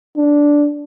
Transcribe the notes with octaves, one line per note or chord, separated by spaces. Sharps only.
D4